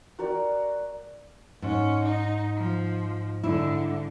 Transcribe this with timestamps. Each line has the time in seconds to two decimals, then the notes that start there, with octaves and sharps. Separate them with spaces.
0.19 F#4 A#4 D5 G5
1.62 G#2 C#4
2.05 D#4
2.56 F3
3.44 G#2 D3 E4